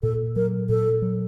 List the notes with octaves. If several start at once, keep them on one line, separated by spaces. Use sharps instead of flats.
A#2 A4
F#3 A#4
A#2 A4
F#3